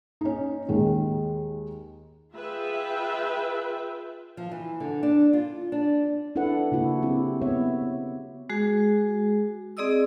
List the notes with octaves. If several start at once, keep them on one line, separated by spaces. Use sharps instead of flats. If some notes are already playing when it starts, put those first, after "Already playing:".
C#4 D#4
D#2 D#3 G#3
F4 G#4 B4 E5 G5
F3
E3
D3
D4
F4
D4
D4 E4 A4 B4 F#5
C#3 A#3 E4 F#4
C4 E4 G4
B3 C#5 E5
G#3 F#4 G#4
C4 G#4 D5 D#5 D#6 E6